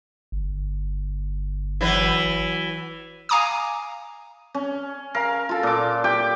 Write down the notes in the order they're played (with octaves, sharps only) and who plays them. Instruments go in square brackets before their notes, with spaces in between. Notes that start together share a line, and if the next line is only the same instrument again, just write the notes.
[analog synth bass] G1
[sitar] E3 F#3 B4
[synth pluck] F5 G#5 A#5 D6 D#6
[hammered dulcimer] C#4
A#4 F5
F4 A4
A#2 D6
G4 G5 D6